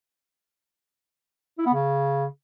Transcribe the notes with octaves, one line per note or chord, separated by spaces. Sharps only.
E4
B3
C#3